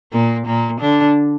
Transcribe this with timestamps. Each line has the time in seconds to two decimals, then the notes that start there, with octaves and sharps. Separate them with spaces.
0.13 A#2 A#3
0.46 A#2 A#3
0.80 D3 D4